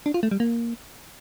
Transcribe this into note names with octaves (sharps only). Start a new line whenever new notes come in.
D4
F4
A3
G3
A#3